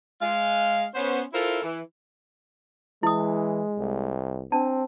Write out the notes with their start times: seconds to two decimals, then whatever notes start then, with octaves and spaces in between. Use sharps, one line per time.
0.22 G#3 F5
0.95 B3 C#4 C5
1.34 E4 F4 A4 A#4 C5 E5
1.63 E3
3.03 E3 G#3 E4 D#6
3.78 C2
4.52 C4 D4 A5